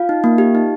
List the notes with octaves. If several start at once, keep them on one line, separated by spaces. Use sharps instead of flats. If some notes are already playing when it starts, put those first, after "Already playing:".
Already playing: F4 F5
D#4
A#3
G4
D#4